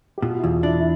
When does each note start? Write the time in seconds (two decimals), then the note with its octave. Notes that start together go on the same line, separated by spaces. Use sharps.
0.18 G4
0.23 B2 F4
0.38 E4
0.43 E2 F4
0.63 D4 E4
0.79 E4